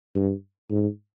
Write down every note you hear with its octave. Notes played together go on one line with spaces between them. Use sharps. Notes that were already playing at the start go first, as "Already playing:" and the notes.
G2
G#2